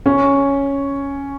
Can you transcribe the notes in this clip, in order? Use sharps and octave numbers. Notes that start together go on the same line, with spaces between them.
C#4